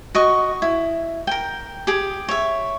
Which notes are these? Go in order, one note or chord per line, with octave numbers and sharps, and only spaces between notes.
F#4 D#5 C#6
E4
A#4 G5
G4 G#4
C#5 E5